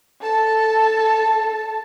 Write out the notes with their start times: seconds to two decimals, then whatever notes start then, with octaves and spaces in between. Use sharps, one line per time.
0.21 A4 A5